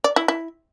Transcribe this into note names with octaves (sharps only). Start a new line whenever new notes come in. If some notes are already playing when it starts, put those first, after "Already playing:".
D5
E4
E4